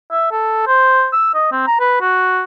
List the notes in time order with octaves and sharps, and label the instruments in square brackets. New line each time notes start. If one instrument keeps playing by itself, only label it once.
[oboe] E5
A4
C5
E6
D#5
C4
A#5
B4
F#4